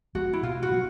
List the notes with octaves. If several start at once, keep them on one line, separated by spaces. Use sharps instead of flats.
F3 G#3 B3 F#4
E4
B2 F4
F#4
F#3 B3